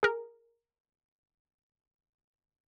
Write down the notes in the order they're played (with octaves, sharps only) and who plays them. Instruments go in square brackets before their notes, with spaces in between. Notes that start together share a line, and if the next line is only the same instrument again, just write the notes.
[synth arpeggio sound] G#4 A#4